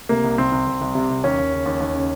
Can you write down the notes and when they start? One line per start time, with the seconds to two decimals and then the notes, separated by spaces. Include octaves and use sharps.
0.09 C3 A#3
0.24 C2
0.38 C2 C4
0.52 C2
0.67 C2
0.81 C2
0.95 C3
1.09 C2
1.24 D#2 C#4
1.38 D#2
1.53 C#3
1.66 D#2
1.80 D#2
1.95 C#3